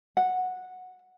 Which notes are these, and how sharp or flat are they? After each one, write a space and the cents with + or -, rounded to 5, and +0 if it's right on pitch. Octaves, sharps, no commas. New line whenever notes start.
F#5 -10